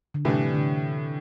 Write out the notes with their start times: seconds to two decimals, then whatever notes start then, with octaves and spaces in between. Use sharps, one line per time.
0.14 D3
0.25 A2 C3 E3 G3 D4
0.54 D3